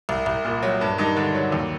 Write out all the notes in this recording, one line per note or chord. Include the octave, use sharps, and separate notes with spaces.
C2
C2
A#2
F#3
G2
G2 D#3 D#4
D3
F#3
D#2